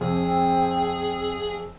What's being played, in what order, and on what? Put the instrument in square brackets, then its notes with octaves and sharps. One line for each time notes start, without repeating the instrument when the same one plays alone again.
[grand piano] F2 [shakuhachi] C4 [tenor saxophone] G#4